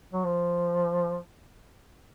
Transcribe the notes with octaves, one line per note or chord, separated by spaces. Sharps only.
F#3
F3